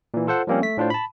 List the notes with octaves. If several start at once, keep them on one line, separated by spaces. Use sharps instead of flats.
A#2 E3
F4 A4 C5 F#5
F3 G3 A#3 C4 C#4
A3 B6
A2 D4 F4 C5
A5 B5